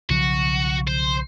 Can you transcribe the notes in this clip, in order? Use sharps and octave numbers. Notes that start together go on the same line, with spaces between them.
B1 C#3 F3 F#4
C5